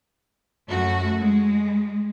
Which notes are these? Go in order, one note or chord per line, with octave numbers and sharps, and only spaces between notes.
F#2 A3 F#4
G#3